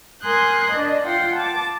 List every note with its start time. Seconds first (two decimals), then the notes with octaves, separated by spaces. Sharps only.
0.22 A#4 G#5 C6 D#6 F#6 G6
0.71 D4 D5 D#5
1.05 F4 F#5 G5 C6
1.36 A5 D6